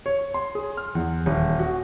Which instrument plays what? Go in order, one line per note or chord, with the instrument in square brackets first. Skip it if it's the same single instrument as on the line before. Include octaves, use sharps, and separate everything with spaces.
[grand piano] C#5
C6
G#4
F6
E2
D#1
F#4